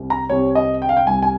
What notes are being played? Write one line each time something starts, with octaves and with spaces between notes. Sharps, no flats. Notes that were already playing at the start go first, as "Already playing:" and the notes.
Already playing: C2 C3 G3
A#5
C2 C3 G3 C#5
D#5
G5
F5
G5
C2 C3 G3 G#5
G#5